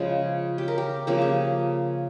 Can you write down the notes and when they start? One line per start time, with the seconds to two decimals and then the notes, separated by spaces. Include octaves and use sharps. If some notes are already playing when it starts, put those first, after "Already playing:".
Already playing: C#3 F3 G#3 G#4
0.58 G4
0.68 A#4
0.78 G4
1.07 C#3 F3 A#3 G4
1.22 G#4